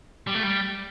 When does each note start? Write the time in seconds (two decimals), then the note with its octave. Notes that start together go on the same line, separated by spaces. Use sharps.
0.27 G3
0.34 A3
0.43 G3